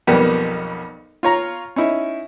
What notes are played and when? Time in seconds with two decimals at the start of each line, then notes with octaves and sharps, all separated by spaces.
0.07 B1 F2 G3 A#3 B3
1.23 F4 C#5 A#5
1.76 C#4 D#4 E4